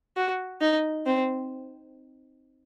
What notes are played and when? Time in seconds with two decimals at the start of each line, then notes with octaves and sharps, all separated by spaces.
0.16 F#4
0.61 D#4
1.06 C4